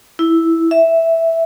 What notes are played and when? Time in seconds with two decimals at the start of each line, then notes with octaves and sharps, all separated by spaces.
0.19 E4
0.71 E5